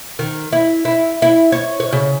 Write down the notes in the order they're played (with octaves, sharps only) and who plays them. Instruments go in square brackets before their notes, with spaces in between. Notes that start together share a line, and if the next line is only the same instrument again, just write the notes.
[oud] D#3
E4
E4
E4
C#5
C#5
C#3